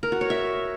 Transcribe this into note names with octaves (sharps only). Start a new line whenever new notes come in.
A#4
F#4
C#5
E5